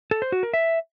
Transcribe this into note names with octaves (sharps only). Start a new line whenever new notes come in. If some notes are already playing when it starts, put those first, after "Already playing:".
A4
C5
F#4
A#4
E5